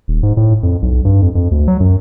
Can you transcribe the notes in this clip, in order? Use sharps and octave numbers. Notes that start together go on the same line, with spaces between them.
D#1
G#2
A2
F2
B1
G2
F2
F2
D2
F#3
F#2